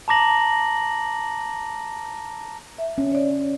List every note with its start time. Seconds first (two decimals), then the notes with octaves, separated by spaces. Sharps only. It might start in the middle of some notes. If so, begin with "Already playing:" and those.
0.08 A5 A#5 D6 A#6 F#7
2.78 E5
2.98 C#4
3.12 C#5 D5